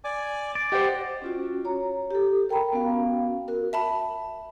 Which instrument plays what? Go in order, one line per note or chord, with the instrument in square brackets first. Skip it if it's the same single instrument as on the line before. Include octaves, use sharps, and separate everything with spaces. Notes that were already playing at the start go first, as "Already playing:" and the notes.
[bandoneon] D5 G#5 D6
[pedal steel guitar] D5
[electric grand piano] G4 C5 [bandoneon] D#5 F#5
[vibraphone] C#4 F4 F#4
C#5 A#5
G4 A4
A#4 G5 A#5 B5
B3 C#4 F#4 F5
F#4 A#4
[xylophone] E5 A5 B5